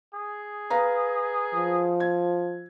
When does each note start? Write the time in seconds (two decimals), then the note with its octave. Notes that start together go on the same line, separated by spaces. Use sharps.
0.14 G#4
0.70 B4 F5 A#5
1.54 F3
2.00 G#6